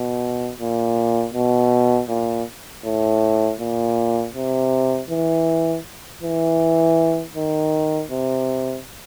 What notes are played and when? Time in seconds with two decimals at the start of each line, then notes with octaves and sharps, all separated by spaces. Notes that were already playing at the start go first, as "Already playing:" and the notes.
Already playing: B2
0.59 A#2
1.34 B2
2.09 A#2
2.85 A2
3.60 A#2
4.34 C3
5.10 E3
6.23 E3
7.35 D#3
8.11 C3